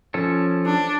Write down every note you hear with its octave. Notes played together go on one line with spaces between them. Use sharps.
F3 C#4 A4
D4